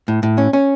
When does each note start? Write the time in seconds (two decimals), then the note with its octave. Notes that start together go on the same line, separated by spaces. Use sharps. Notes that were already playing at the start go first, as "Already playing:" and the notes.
0.08 A2
0.23 A2
0.38 C#4
0.53 C#4